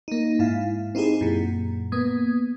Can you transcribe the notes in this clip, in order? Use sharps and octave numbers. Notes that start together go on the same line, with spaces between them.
A#3 D#4
G#2 E4 F5
C4 D#4 E4 G4 G#4
F#2 A#2
A#3 B3 D#6 G#6